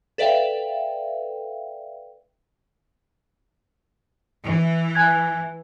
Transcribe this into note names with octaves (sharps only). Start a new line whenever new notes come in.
A4 B4 D5 E5 F5 G5
E3
G#5 F#6 G#6